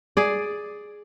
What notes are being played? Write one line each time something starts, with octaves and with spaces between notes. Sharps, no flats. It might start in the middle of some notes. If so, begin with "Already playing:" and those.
G#4 D5